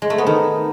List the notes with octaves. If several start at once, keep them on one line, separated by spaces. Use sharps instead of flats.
G#3
A3
B3
D#3